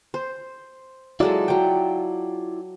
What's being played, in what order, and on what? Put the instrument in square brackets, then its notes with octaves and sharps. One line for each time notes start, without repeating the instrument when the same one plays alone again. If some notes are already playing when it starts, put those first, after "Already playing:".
[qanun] C5
[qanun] F#3 G#3 A4 [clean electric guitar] E4 F4 D5
[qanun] F#3 G5